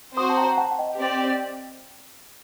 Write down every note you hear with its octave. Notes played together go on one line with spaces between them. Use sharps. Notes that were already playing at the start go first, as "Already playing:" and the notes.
C4 F#4 C5 C6 D#6
A5
G5 A#5
F#5 A5
F#5
D#5 G5
C4 G4 D5